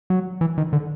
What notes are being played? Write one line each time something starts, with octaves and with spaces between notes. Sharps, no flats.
F#3
E3
D#3
D3